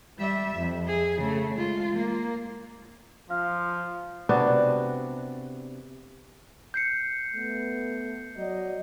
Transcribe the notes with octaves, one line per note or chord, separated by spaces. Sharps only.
G3 E5
F2
G#4
C#3 A3
G#3 F4
A#3
F3 F5 F6
C3 B3 D4 F#4
G6 C7 C#7
A3 B3
F#3 D5 D#5